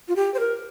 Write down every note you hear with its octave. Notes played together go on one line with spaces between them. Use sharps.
F4
G4
C5
A#4